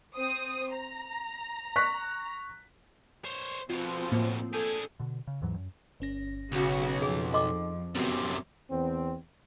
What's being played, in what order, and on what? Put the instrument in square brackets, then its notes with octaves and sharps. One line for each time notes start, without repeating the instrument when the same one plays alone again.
[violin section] C4 C5 D#6
A#5
[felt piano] C#6 F#6 B6
[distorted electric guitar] C5 C#5
[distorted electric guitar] F2 B2 [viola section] F3 C4 [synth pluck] F4
[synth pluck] A2 A#3
[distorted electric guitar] D4 G#4 [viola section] A4 [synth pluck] G6 G#6
[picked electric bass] B2 D3
C#3
D#2 G#2 E3 F#3
F#2
[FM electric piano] G1 C#4 A#6
[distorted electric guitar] B1 [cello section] C#3 F#4
[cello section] F2 [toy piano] G#4
[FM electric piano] D#4 A4 [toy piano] D#5 C6 D6
[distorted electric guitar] F#2 C3 [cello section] F#3 [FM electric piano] B3 C4 F#4
[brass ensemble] E2 C4